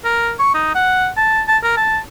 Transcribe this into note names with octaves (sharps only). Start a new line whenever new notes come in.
A#4
C#6
D#4
F#5
A5
A5
A#4
A5